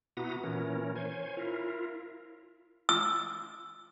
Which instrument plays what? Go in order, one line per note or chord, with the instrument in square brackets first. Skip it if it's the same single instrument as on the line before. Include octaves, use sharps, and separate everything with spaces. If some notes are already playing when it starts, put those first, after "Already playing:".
[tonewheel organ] B2 B3 E4 F#4 A#5 D#6
A#2 E3 C#4 A#4
C5 C#5 G#5
E4 F4 A#4
[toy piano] E6